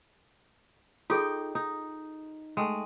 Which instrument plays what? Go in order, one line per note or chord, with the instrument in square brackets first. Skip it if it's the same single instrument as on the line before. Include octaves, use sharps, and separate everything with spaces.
[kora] D#4 G5 [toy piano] F4 G#4 A4
[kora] D#4
[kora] G#3 A3 [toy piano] G5